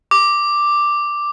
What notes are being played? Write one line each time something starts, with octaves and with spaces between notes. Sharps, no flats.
D6